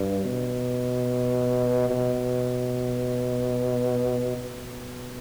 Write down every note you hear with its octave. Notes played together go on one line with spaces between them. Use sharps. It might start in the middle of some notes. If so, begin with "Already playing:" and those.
Already playing: G2
B2
B2
B2